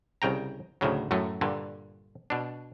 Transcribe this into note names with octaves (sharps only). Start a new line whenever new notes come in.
C2 C#3 G5 A#5
D2 A2 C#3 F#3
F#2 A2 F#3 A3
G2 A#2 D3
B2 D4